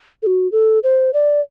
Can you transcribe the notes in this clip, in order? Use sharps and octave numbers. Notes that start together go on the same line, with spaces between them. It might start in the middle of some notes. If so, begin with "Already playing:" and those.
A4
F#4
A4
C5
D5